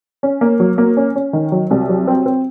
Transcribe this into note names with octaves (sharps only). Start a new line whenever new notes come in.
C#4
A#3
F#3
A#3
C#4
C#4
D#3
F#3
C2
F#3
C4
C4